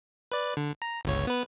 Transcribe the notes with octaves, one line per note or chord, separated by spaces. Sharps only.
B4 D5
D3
A#5
G1 C#2 C#5
B3 B4